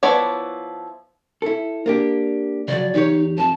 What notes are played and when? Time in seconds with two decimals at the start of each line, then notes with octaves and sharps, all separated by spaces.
0.03 F3 B3 E4 C#5 D5
1.42 E4 A4
1.86 A#3 D4 G4
2.68 C#3 F3 F#3 D5
2.94 E2 D#4 G4 C#5
3.38 F2 A5